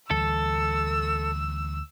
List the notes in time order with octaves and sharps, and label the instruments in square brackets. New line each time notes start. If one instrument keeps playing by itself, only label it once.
[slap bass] D2 E3 G3 [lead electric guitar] A4 [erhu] E6